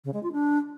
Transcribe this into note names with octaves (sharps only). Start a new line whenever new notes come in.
C#3
G#3
F4
D4